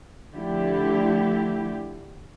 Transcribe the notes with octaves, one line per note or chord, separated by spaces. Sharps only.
D3 F3 A3 E4 G4